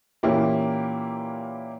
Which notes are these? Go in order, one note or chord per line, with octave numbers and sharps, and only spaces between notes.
A#2 E3 A#3 C#4 E4 G4